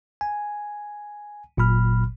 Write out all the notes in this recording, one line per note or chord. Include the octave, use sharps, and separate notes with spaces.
G#5
G1 A#2 F#3 B5 F6